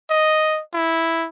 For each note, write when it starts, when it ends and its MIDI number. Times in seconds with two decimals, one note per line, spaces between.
0.10 0.60 75
0.74 1.28 64